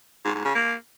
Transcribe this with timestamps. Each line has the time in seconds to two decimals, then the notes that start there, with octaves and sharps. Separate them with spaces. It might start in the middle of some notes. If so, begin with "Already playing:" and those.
0.25 G#2
0.35 G#2
0.45 C#3
0.55 A#3